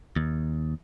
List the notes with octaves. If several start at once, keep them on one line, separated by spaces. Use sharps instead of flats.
D#2